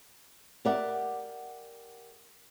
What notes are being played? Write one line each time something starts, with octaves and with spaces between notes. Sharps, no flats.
G4 A#4 D5 E5 F#5